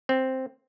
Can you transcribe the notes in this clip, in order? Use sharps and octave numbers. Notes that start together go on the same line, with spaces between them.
C4